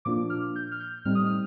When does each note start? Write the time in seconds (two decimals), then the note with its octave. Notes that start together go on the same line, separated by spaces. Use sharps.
0.05 A#2 F3 A#3 D4 F4 D6
0.30 F6
0.56 G6
0.71 F6
0.80 G6
1.05 A2 G3 C4 D#4 F6
1.15 D#6
1.26 F6